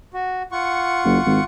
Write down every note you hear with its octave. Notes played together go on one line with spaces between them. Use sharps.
F#4
F4 F#5 C#6
F#1
G#1